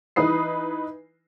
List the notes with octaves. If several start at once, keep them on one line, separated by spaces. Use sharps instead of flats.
E3 D#4 B4 D#6 C7